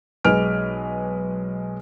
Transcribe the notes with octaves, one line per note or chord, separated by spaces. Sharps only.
B1 G#3 B4 G#5 F6 D7